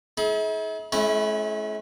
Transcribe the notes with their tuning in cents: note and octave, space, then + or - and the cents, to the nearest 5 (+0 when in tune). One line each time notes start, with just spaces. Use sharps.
E4 -45 G#4 +40
A3 -45 C#4 -20 E4 +0